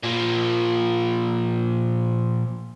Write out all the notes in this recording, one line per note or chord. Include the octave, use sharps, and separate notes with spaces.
A#2 F3